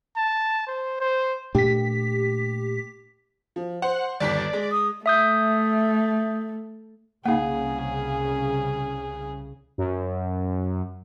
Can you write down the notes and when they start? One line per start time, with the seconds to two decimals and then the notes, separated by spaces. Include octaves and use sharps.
0.16 A5
0.67 C5
1.00 C5
1.55 A#2 A3 D4 G4 B6
3.56 F3
3.82 C5 F#5
4.20 G1 D#2 D5 B6
4.53 G#3
4.71 D#6
5.06 A3 E5 D#6 G6
7.26 C2 C#3 A#3 D#4 G#4 F5 F#5
9.78 F#2